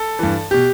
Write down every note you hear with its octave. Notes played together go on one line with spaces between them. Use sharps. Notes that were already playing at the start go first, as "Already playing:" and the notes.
Already playing: A4
G2 E3
B2 G4